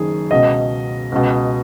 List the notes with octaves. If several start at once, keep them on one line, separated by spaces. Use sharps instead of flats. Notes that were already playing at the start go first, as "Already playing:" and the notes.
Already playing: F#1 F#2 D#3 G#4
C#2 B2 D#5
C#2 B2